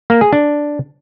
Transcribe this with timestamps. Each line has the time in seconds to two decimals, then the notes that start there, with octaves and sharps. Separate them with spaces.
0.10 A#3
0.21 G#4
0.33 D4